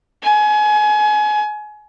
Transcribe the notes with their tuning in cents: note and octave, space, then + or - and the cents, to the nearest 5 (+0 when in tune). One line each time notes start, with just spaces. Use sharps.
G#5 +30